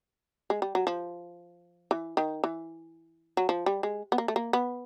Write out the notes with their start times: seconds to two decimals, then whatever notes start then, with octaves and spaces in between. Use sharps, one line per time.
0.50 G#3
0.62 G3
0.75 F#3
0.87 F3
1.91 E3
2.17 D#3
2.44 E3
3.37 F#3
3.49 F3
3.66 G3
3.83 G#3
4.12 B3
4.18 A#3
4.28 A3
4.36 A#3
4.53 B3